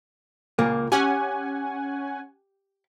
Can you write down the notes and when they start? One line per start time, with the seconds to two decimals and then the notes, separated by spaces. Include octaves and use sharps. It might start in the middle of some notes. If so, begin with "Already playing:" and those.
0.59 C#2 A#2 A#3
0.92 C#4 G4 F#5 G#5